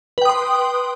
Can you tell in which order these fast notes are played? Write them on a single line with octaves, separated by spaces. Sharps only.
B4 G5 D#6 C6